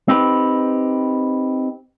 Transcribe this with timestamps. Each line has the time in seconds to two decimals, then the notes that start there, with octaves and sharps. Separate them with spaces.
0.08 C4 D#4 G4 B4